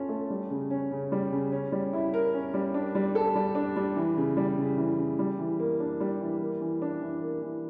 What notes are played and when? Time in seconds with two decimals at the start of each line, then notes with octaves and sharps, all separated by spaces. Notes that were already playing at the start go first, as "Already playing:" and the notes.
Already playing: C#4 F4 A4
0.09 A3
0.30 G3
0.50 C#3
0.70 C#4
0.91 C#3
1.12 G3
1.32 C#3
1.52 C#4
1.72 G3
1.93 E4
2.14 A#4
2.33 C#4
2.54 G3
2.74 D4
2.95 G3
3.15 A4
3.35 G3
3.55 D4
3.76 G3
3.96 E3
4.17 C#3
4.37 G3
4.57 C#3
4.77 E3
4.99 C#3
5.19 G3
5.38 E3
5.59 A#3
5.80 D4
6.00 G3
6.21 E3
6.41 A#3
6.61 E3
6.82 D4
7.01 E3
7.22 A#3
7.42 E3